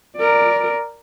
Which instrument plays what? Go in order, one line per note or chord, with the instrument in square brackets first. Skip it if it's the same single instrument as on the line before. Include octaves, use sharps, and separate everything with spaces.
[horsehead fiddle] A#4 D5